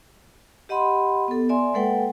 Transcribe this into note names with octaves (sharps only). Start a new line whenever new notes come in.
G4 D#5 F#5 B5 C6
B3 A4
D5 E5 G#5 C6
G#3 A#3 A4 B4 F#5 G5